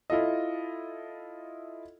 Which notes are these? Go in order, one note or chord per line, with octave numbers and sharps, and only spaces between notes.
E4 F4 A4 D#5